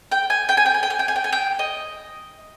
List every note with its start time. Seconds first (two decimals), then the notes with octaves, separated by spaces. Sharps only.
0.12 G5
0.30 G#5
0.49 G5
0.57 G#5
0.66 G5
0.74 G#5
0.83 G5
0.90 G#5
0.99 G5
1.08 G#5
1.16 G5
1.24 G#5
1.33 G5
1.59 D#5